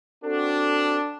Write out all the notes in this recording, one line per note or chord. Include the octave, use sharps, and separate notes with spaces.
C4 D4 F#4 A4